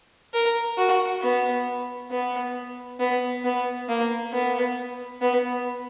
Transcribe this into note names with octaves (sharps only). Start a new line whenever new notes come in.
A#4
F#4
B3
B3
B3
B3
A#3
B3
B3